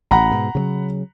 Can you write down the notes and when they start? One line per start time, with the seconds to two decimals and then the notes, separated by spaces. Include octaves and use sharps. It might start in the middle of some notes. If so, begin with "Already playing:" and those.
0.11 A1 F#5 A#5 B5
0.31 G#2 B2
0.55 C#3 F3 F#3